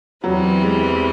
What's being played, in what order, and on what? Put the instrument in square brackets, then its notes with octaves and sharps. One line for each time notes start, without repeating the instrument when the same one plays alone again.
[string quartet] E2 C3 E3 G3 [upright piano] F#3
[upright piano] G#3